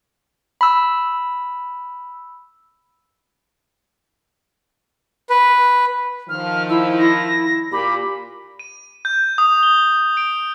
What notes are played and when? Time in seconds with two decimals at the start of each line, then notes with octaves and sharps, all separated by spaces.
0.61 B5 E6
5.30 B4
6.29 D#3 F3 F6
6.69 E4 E6
6.98 E4 A#6
7.72 A#2 G4 B5
8.59 D#7
9.05 G6
9.38 D#6
9.63 G7
10.17 D7